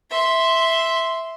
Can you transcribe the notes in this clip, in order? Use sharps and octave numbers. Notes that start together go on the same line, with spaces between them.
E5 C6